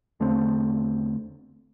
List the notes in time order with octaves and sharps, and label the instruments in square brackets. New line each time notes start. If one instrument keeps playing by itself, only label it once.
[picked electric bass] E2 D3 A3 C4